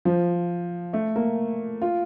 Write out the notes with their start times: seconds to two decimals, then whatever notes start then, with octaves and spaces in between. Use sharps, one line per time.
0.05 F3
0.93 A3
1.16 A#3
1.82 F4